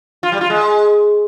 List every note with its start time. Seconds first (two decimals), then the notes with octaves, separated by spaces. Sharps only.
0.23 F4
0.32 G3
0.41 F4
0.50 G#3